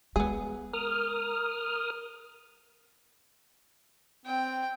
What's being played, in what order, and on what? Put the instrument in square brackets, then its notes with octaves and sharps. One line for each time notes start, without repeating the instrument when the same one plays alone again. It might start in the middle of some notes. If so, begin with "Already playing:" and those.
[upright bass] G#3 [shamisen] B3 G#4
[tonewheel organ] A#4 D#6 F6
[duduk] C4 [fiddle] G5